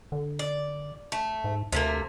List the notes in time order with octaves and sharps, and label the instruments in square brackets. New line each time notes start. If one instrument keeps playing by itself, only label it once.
[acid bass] D3
[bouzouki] D5
A3
[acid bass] G#2
[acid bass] D2 [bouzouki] C3 A3 A#3